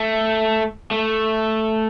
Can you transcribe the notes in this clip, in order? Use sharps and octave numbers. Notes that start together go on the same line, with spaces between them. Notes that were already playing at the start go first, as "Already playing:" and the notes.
Already playing: A3
A3